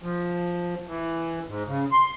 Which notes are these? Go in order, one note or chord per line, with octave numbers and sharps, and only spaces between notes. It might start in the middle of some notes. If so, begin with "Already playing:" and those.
F3
E3
G#2
C#3
C6